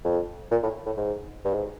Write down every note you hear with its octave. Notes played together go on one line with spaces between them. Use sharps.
F2
A#2
A2
A2
G#2
G2
G#2